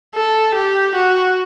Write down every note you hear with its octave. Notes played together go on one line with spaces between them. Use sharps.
A4
G4
F#4